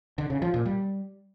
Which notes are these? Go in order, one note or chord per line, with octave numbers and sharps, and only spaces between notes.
D3
C#3
F3
A#2
G3